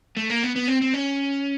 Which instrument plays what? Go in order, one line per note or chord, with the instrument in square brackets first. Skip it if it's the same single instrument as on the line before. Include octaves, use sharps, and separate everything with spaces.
[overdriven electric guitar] A3
A#3
B3
B3
C4
C4
C#4